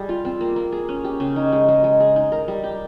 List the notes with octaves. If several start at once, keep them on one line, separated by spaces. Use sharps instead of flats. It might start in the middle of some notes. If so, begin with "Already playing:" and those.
Already playing: G3 G#4
F4
C4
A#3
A#3
G#4
C#4
G4
C#3
D#4
G#3
G#3
G#3
G#4
D#4
A#4
G3
G4